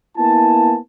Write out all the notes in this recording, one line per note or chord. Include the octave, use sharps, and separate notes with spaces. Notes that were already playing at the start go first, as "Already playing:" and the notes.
A#3 B3 E4 G#5 A5